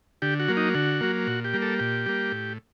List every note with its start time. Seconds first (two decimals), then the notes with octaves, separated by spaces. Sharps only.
0.22 D3 G4
0.40 F#4
0.48 F#3 A#3
0.57 D#4
0.75 D3 F#4
1.01 F#3 A#3
1.27 A#2 F#4
1.45 G4
1.53 G3 A#3
1.62 A4
1.79 A#2 G4
2.06 G3 A#3
2.32 A2